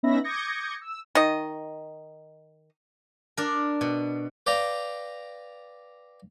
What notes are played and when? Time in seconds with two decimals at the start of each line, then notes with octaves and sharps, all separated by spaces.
0.03 B3 C#4 D#4 E5 B5 A#6
0.24 D6 D#6 G6 G#6 A#6 C#7
0.82 E6
1.15 D#3 D#5
3.37 D4 A#4
3.81 B2
4.46 B4 D5 F5 G5 A#5